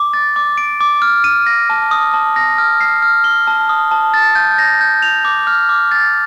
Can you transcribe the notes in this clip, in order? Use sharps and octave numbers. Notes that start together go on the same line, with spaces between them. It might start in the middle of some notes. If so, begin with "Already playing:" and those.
Already playing: D6
A6
D6
D7
D6
F6
D#7
A#6
A5
D#6
A5
A#6
F6
C7
F6
G7
A5
D#6
A5
A6
G6
A#6
G6
F7
D6
F6
D6
A6